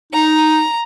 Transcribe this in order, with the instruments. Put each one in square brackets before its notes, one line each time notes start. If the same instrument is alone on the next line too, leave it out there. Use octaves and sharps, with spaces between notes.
[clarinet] D#4 [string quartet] A#5